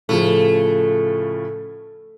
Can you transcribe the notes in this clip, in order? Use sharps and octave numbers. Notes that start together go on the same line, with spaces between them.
A2 C#3 F3 A3